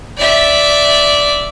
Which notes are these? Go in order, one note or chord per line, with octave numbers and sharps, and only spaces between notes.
D5 E5